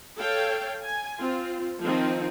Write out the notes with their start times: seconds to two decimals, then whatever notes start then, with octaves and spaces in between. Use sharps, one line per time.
0.19 A4 C#5 F5 G5
0.85 G#5
1.17 C4 F4
1.83 D#3 F3 C4 D#4